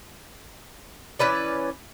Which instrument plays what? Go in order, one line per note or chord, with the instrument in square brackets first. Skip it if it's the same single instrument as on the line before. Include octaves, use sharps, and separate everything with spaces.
[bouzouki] E3 C#4 B4 D5